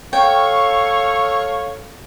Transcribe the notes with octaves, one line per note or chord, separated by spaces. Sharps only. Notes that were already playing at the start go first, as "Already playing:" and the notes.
A4 C#5 F5 G5 C#6